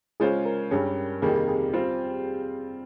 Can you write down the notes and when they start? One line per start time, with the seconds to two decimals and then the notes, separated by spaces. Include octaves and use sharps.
0.20 C#3 G#3 C#4 F4 G#4 C5
0.45 A#4
0.71 G2 G3 C#4 G#4
1.22 F2 C3 D#3 G3 A#3 G#4
1.35 G4
1.48 G#4
1.73 G3 C4 F4 C5